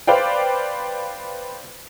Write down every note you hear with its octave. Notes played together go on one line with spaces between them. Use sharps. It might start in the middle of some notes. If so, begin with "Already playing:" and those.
B4 C5 D5 F5 G5